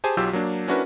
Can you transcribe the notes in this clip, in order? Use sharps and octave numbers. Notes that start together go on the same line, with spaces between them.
G4 G#4 C5 G#5 A5
B1 F#3 F4 G4 E6 G6
F#3 A#3 D4
C#4 D4 E4 F#4 A#4 B4